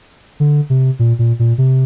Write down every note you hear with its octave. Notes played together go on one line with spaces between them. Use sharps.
D3
C3
A#2
A#2
A#2
C3